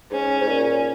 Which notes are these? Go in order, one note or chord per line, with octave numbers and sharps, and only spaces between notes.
G#2 C#4
G#2
A#2